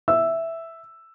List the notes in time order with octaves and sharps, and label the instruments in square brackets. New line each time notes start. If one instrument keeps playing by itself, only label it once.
[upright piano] E5 E6